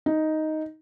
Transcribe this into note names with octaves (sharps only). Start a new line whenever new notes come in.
D#4